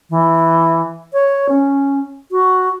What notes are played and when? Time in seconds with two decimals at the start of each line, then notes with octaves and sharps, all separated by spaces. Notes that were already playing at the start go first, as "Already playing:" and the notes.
0.10 E3
1.13 C#5
1.49 C#4
2.31 F#4